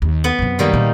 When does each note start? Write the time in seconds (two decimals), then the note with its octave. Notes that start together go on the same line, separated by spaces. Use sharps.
0.02 D#2
0.24 B3
0.39 F#2 C3
0.59 D#3 G3 A#3
0.73 A#2